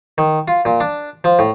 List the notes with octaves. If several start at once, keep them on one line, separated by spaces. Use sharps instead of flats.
D#3
F4
A#2
D4
F3
A2